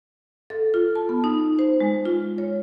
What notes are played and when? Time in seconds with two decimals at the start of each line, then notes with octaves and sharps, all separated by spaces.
0.50 A4
0.74 F4
0.96 A5
1.09 B3
1.24 D#4
1.59 C5
1.80 G#3
2.05 F4
2.38 C#5